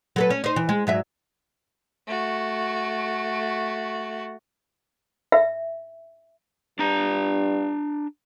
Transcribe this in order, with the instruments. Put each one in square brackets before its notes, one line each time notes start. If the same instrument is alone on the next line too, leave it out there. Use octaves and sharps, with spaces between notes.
[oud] F#3 A4 B4
C#4
D#4 C5
E3
G#3
G#2 F#3 E5
[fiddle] A3 F#4
[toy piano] E5
[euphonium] G2 [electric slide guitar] D4 A#5